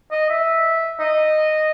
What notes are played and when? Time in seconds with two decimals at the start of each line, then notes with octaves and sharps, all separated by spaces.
0.12 D#5
0.30 E5
1.00 D#5